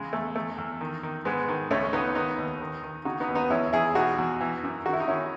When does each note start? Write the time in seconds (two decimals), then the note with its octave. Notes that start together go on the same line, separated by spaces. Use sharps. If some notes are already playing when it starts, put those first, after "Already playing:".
Already playing: E2 C#3 G#3
0.13 E2 A3
0.36 E2 A3
0.58 E2
0.81 D#3
1.03 D#3
1.25 G#2 G#3 B3
1.48 D#3
1.71 C#2 A3 C#4
1.93 C#2 B3 D#4
2.15 D#3 B3 D#4
2.38 D#2
2.61 D#3
2.83 D#3
3.05 C#3 D#4 F#4
3.20 B3 D#4
3.28 D#2
3.35 B3 D#4
3.50 E2 C#4 E4
3.73 E2 E4 G#4
3.95 B2 D#4 F#4
4.18 E2
4.41 E3
4.63 F#2
4.85 D#3 F#4
4.93 E4
5.00 D#4
5.08 D#3 C#4 E4